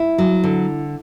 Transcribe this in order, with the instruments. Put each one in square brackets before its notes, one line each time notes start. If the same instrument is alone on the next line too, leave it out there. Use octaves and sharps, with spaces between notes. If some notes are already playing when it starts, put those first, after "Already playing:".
Already playing: [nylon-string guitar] E4
F#3
D3